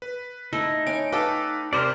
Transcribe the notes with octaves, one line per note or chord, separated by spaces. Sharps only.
B4
A3 D#4 E4
C#4 D7
A4 B4 F5 G5 D6
C3 A#4 C5 D5